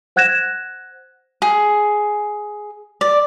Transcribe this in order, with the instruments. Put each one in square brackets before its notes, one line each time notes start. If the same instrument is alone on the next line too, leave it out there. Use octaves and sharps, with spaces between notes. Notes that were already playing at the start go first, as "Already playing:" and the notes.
[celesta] C5 F#5 F#6 G#6 A#6 E7
[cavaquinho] G#4
D5